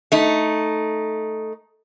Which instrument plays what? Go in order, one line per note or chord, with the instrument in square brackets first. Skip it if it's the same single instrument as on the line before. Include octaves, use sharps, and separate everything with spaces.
[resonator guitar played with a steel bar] A3 D#4